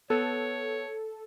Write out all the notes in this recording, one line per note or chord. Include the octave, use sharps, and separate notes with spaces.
B3 A4 C#5